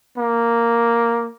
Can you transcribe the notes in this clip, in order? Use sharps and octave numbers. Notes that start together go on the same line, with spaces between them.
A#3